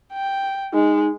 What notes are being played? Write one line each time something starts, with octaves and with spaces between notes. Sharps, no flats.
G5
G#3 D#4